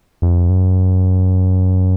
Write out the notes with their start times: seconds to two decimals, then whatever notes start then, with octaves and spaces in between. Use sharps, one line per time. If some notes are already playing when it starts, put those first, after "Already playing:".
0.22 F2
0.50 F#2